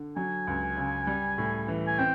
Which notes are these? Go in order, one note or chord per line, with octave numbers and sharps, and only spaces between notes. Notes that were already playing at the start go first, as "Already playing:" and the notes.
Already playing: D3
F#3 G#5
C#2
C#3
G3
A2
E3
G#5
C4 G5